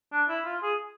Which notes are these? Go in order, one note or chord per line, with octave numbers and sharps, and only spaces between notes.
D4
E4
F4
G#4